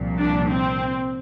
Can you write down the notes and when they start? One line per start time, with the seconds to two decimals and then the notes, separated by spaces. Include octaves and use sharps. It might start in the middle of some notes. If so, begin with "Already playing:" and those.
Already playing: C2 A#2 F3
0.19 D4
0.50 C4